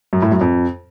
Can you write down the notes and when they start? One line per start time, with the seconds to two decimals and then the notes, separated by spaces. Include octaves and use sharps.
0.13 F#2
0.22 A2
0.32 F#2
0.41 F2